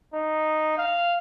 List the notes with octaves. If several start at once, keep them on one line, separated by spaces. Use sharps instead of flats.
D#4
F5